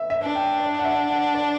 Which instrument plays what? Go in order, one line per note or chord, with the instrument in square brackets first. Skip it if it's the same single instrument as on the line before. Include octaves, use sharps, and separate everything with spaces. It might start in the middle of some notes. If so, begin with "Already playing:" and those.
Already playing: [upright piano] E5
E5
[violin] D4
[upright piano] G5
D5
F#5
E5
F#5
D5